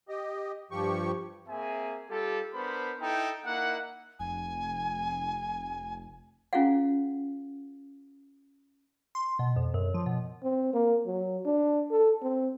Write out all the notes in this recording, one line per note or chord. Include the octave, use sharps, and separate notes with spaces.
G4 D#5
G2 F3 G4 C#6
A#3 C4 G#4 E5 G#5
G3 F4 G4 A4
B3 D4 A#4 C5 B5
D#4 E4 A4 G5
A#3 D#4 E4 F#5
F1 G#5
C#4 E4 F4 G#4 F5 F#5
C6
B2
F2
F#2
F3
B2
C4
A#3
F#3
D4
A4
C4